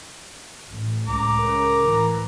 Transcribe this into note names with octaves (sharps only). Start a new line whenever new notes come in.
A1
C#2 A2 A#5 D6
C#3 A#4
A2 E3